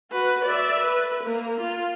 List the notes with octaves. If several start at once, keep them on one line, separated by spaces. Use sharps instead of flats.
F#4 B4
D5 E5
B4
A#3
F4